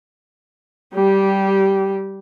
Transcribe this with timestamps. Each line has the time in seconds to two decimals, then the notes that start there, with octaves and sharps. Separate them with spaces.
0.95 G3 G4